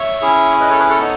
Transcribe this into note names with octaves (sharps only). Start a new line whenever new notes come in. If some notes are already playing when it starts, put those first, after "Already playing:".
Already playing: C#5 E5
C#4 E4 G#4
B4 D#5
A4 C#5
G#4 B4
A4 C#5
B3 D#4